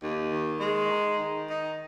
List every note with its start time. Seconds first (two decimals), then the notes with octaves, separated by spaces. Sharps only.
0.01 D#2
0.31 D#3
0.60 G#3
0.90 D#4
1.18 D#3
1.48 D#4